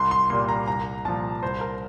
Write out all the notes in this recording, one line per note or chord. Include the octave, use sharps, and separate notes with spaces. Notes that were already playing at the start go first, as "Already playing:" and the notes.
Already playing: C2 C6
C6
A#2 G3 A#3 C6
A#5
C2 A#5
A#2 F3 A5
C2 C5
A#4